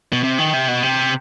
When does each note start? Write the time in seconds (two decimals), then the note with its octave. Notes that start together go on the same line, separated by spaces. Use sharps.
0.13 B2
0.23 C3
0.38 D#3
0.53 C3
0.68 B2
0.83 C3